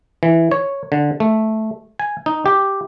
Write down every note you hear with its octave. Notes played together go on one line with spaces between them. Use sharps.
E3
C#5
D3
A3
G#5
D#4
G4